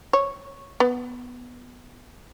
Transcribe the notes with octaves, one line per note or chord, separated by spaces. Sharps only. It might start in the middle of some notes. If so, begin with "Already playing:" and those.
C#5
B3